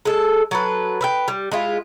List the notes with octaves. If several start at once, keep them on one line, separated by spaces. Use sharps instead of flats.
G#3 A4
F#3 A4 B4
B4 E5 G5
G3
G#3 E4 F4